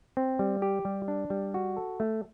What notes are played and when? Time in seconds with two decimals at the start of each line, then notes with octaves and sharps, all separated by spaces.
0.17 C4
0.39 G3
0.62 G4
0.85 G3
1.08 D4
1.30 G3
1.54 F#4
1.77 A4
2.00 A3